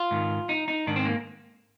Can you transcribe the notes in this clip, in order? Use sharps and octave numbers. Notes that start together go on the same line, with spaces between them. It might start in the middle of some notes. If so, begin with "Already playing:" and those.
Already playing: F4
G#2 D#3
D#4
D#4
G#2 D#3 D4
C4
A#3